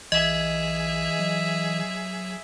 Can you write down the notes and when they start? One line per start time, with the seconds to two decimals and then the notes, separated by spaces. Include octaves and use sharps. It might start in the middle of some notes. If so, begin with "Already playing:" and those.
0.12 B1 E3 G#4 D#5 E5
1.19 F#3